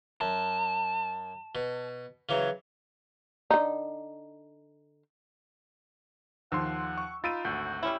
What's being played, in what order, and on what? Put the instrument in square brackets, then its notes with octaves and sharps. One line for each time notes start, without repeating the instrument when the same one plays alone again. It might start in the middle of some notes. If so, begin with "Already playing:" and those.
[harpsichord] F#2 [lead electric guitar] A5
[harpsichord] B2
C#3 E3 F#3
[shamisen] D3 D#4
[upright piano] D#2 F3 [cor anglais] F#5 [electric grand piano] C6 E6
[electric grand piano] C#6
[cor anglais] D#4 [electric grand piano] F4 B5 E6 [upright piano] A6 D7 D#7
[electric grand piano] G#1 D2 [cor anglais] F#4 [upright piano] G6
[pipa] G3 C#4 E4